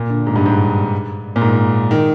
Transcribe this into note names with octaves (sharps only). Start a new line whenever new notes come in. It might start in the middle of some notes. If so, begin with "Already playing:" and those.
Already playing: A#2
D3
G#2
G2
G#2
A#2
G#2
D#3